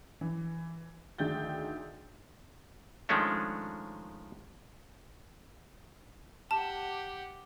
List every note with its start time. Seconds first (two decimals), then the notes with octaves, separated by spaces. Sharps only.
0.21 E3
1.18 D2 D#3 G#4 G5 G6 A6
3.09 D#3 F3 G#3 A3 C#4 D4
6.51 G4 F#5 A5